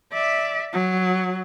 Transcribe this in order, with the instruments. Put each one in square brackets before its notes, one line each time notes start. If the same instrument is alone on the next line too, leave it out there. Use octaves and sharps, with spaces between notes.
[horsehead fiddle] D5 E5
F#3